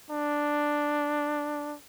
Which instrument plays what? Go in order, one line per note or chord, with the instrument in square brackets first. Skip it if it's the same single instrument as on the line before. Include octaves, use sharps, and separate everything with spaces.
[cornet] D4